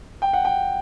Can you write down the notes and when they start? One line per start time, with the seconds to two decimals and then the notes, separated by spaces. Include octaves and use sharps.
0.22 G5
0.33 F#5
0.45 G5